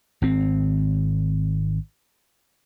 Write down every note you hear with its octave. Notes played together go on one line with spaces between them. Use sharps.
G#1 C4